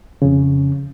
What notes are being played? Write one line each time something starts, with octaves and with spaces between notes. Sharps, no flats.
F2 C#3